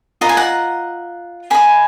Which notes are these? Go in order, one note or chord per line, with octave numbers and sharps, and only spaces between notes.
F4 B4 D#5 A#5
G#5
F#5 A#5
G#4 D#5 G#5 B5